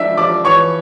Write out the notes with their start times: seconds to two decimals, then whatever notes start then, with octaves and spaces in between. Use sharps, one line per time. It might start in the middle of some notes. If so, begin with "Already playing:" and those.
Already playing: F3 D4 E5 E6
0.17 F3 D5 D6
0.44 E3 C#5 C#6